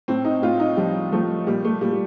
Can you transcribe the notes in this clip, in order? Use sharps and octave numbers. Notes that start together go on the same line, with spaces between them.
A2 C4
D#4
A2 F4
D#4
F3 G3
F3 A3
A#2 G3
A3
A#2 G3
G3